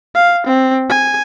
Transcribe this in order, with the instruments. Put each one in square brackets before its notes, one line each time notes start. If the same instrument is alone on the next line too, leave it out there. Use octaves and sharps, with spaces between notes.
[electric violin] F5
C4
G#5